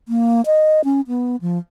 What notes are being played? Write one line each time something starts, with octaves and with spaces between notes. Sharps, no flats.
A#3
D#5
C#4
B3
F3